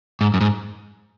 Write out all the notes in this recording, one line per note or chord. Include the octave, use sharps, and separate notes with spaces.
G#2
F#2
G#2